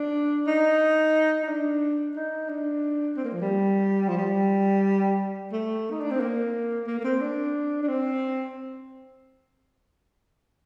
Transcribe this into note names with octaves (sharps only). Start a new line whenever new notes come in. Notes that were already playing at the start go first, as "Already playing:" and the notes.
Already playing: D4
D#4
D#4
D4
D#4
D4
C4
A#3
F3
G3
F3
G3
A3
D#4
D4
C4
A#3
A#3
A#3
C4
D4
D4
C4